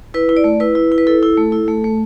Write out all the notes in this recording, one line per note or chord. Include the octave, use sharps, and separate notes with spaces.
E4 B4
E4
D5
A3
E4 B4
E4
E4
B4
E4 A4
E4
A3
E4
A3
A3